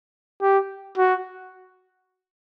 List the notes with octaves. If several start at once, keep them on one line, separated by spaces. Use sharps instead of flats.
G4
F#4